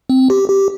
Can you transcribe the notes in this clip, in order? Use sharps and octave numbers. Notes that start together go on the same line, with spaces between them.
C4
G4
G4